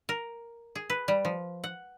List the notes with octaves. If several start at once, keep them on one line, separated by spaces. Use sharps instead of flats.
A#4
G#4
B4
G3
F3
F#5